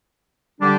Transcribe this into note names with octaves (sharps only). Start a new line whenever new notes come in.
D3 G3 D4 G4